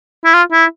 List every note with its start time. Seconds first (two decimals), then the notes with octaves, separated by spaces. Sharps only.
0.25 E4
0.34 F4
0.52 E4